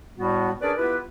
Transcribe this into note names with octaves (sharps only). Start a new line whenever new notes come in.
A2 G3 B3 F#4
C#4 D4 G#4 A#4 B4 D5
B3 E4 F4 G4 B4